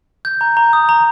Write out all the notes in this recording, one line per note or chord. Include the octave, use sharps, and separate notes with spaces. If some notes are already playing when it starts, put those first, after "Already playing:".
G6
A#5
A#5
D#6
A#5